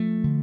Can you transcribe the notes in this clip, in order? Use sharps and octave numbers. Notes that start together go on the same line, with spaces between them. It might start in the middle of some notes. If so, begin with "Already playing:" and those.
Already playing: F3 A3
D3